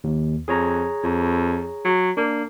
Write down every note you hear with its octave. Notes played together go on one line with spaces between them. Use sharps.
D#2
F2 G#4 C#5 A#5
F2
F#3
A#3 D4